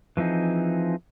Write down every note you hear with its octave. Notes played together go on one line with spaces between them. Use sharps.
E3 F3 C4 D#4 G#4